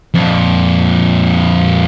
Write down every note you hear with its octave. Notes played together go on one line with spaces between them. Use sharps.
F2 A#2